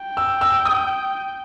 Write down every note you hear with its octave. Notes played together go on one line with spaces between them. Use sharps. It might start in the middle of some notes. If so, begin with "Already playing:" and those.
Already playing: G5
E6
E6
D#6